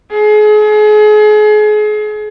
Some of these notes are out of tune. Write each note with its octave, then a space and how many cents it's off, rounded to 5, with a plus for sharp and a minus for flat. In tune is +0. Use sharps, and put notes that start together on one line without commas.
G#4 +35